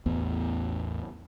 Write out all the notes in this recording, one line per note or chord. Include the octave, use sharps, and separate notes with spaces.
A1 E2 B3